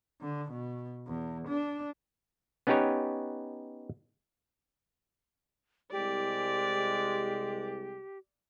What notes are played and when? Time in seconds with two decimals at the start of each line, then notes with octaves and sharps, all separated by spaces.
0.21 D3
0.51 B2
1.07 E2
1.48 D4
2.67 B3 C#4 D#4 G4 B4 C#5
5.92 C2 G#3 G4 D5